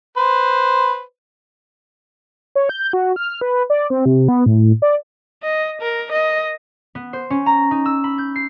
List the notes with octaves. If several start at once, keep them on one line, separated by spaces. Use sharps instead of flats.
B4 C5
C#5
G6
F#4
F6
B4
D5
C4
C3
B3
A2
D5
D#5
A#4
D#5
B3
C5
C#4
A#5
D#4
E6
B5
G6
C7